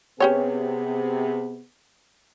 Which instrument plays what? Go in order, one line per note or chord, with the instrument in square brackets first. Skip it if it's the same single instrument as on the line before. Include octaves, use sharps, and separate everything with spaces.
[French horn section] C3 B3 G#4 [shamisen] C#4 G4 C#5